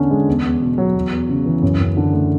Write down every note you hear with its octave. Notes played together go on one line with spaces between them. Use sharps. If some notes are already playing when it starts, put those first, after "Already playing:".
Already playing: E2 D3 C#4
G#3
E2
E2
B2
F#3
E2
E2
C#3
E3
F#2
F#2
D3
A3